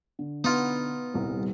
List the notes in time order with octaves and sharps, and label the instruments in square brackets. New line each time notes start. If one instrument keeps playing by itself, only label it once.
[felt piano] D3
[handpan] B3 [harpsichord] D#4 F4
[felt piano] D#1 C2